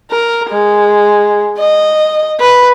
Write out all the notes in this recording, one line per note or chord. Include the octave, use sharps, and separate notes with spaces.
A#4
G#3
D#5
B4